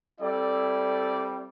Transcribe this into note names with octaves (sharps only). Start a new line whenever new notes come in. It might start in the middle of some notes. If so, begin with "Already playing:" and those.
G3 C4 E4 A4 D5